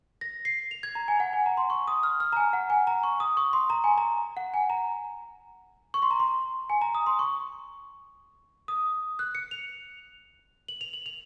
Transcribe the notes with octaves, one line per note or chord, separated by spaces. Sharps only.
A#6
C7
F7
G#6
A#5
G#5
F#5
G#5
A#5
C6
C#6
D#6
F6
F6
A#5
G#5
F#5
G#5
A#5
C#6
D#6
C#6
C6
A#5
G#5
A#5
F#5
G#5
A#5
C#6
C6
A#5
C6
G#5
A#5
D#6
C6
C#6
D#6
F#6
C#7
F7
F#7
F7
F#7
F7